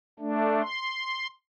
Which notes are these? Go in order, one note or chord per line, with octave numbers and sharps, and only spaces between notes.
A3 D4
C6